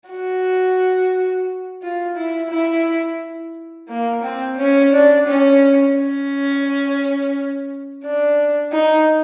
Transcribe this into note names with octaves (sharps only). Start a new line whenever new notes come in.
F#4
F4
E4
E4
A#3
C4
C#4
D4
C#4
C#4
D4
D#4